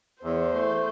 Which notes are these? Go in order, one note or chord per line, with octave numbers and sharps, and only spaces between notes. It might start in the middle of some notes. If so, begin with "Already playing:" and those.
E2 C5
A3